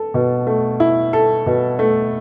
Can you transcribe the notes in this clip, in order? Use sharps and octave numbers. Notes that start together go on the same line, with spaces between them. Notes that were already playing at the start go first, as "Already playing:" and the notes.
Already playing: A4
B2
A3
E4
A4
B2
A3